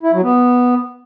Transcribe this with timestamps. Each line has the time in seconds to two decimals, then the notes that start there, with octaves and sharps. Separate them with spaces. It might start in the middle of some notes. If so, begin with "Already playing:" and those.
0.03 E4
0.13 F#3
0.23 B3